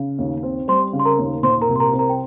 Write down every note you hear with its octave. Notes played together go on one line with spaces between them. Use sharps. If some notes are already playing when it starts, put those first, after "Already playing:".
Already playing: C#3
D#2
C4
G3 C5 C6
C#3
C6
A#4 A#5
D#2
A#2 C5 C6
A#4 A#5
C2
C6
A#4 A#5
C4
A#4 A#5
G5